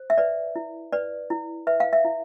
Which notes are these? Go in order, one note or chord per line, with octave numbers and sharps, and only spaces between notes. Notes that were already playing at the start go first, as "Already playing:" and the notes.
Already playing: C5
E5
B4 D5
E4
B4 D5
E4
B4 E5
F5
E5
E4